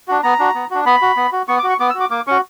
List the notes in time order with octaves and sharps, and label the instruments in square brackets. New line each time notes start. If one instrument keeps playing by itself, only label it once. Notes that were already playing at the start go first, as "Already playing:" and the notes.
[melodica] D4 F#4
B3 A#5
D4 F#4
B3
D4 F#4
B3 B5
F#4
B3
F#4
B3 C#6
D6
F#4
C#6
B3 D6
E6
F#4
D6
A#3 D6
C#4 F#4 C#6